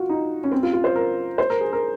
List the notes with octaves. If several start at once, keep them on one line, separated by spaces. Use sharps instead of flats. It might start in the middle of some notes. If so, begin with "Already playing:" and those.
Already playing: F4 F#4
D#4
C#4
C4
F4
F4
C5
A#4
C5
A#4
G#4
A#4